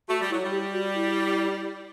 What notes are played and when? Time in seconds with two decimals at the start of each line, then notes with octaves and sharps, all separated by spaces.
0.08 A3 F#4
0.20 G3
0.30 F#3 E4
0.44 G3
0.51 G4
0.73 F#4
0.95 E4